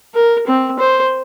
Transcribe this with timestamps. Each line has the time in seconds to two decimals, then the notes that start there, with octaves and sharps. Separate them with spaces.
0.15 A#4
0.47 C4
0.79 C5